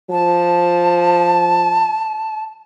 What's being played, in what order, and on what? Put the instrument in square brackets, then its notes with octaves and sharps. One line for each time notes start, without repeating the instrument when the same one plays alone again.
[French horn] F3 [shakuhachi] A5